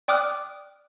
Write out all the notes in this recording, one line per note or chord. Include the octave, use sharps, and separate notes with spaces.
D5 G5 D6 D#6 F6 F#6